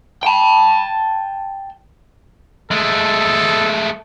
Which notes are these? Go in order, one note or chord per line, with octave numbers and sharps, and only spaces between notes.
G5 A5
G#3 A3 A4